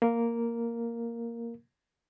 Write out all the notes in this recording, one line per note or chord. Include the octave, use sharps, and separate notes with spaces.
A#3 A#4